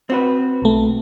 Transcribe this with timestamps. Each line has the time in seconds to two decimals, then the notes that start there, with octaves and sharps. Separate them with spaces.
0.10 C4 F#4 B4
0.62 B1 A3